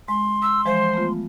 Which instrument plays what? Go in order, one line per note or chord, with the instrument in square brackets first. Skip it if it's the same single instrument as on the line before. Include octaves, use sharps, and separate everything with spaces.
[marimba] G#3 [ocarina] C6
[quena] E6
[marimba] E3 F3 G#3 [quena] C5
[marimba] A3 B3 F4